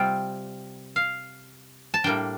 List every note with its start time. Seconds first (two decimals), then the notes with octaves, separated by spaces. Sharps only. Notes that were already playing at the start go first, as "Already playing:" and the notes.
Already playing: C3 G3 C4 F4 G5
0.96 F5
1.94 A5
2.04 A2 G3 A#3 D4 G5